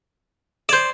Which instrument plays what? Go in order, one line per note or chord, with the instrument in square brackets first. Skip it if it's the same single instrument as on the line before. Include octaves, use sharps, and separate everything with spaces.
[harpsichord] C5 D5 [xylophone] G6 G#6 E7